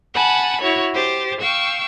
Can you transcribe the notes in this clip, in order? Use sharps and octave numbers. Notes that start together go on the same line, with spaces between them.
F#5 G#5 A5 B5
E4 F#4 C#5
G4 C5 A6
F5 G5 C#6 E6